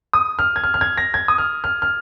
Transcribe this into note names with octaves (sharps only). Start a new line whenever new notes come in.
D#6
F6
G#6
F6
F6
G#6
A#6
G#6
D#6
F6
F6
F6